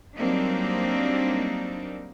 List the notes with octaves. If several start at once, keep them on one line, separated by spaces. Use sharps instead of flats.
F#3 G3 A#3 C4 D4 D#4